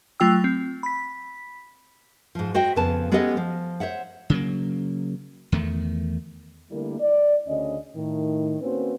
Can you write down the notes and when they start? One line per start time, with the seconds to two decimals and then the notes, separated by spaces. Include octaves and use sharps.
0.20 F#3 A3 F4 G5 E6
0.44 C4
0.83 B5 B6
2.35 G#2 F3
2.54 F#4 C5 D#5 G5
2.76 F2 C#3 B3 B4 G#5 A5
3.12 G#3 B3 C#4 G4 A4 D#5
3.37 F3
3.80 C5 C#5 E5 F#5
4.30 C#3 F#3 A#3
5.52 E2 D#3 A3
6.71 D3 G3 A3 A#3 E4 A#4
7.00 D5
7.48 D2 C#3 C#4 D#5
7.96 A2 D#3
8.61 A#3 C4 C#4 F#4 B4 C5